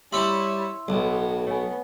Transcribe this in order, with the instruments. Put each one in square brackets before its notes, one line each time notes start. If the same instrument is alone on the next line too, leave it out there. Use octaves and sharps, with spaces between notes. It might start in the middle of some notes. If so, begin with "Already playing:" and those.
[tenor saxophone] G3 [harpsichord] C#4 B5 [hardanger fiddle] E4 C#5 [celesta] E5 C6 E6
[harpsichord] B1 [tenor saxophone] A2 [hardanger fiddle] B3
[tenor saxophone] A3 [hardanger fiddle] B3 [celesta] C#5 G#5